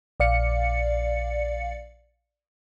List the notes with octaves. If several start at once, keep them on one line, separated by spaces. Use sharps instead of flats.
A#1 D5 F5 C#7